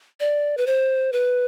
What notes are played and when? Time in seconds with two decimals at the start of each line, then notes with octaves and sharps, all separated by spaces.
0.20 D5
0.57 B4
0.66 C5
1.13 B4